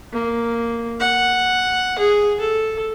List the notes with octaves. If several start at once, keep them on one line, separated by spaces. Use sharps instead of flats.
A#3
F#5
G#4
A4